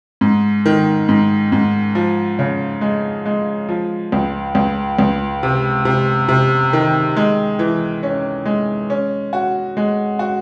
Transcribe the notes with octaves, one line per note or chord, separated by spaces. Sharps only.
G#2
D#3
G#2
G#2
F3
C#3
G#3
G#3
F3
C#2
C#2
C#2
C3
C3
C3
D#3
G#3
E3
C#4
G#3
C#4
F#4
G#3
F#4